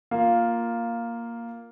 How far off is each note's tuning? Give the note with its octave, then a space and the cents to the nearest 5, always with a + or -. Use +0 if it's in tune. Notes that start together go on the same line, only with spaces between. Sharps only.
A#3 +0 F4 +0